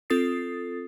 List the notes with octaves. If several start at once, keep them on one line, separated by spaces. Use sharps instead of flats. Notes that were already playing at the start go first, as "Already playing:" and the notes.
C4 F4 A4 D#6 A6 C7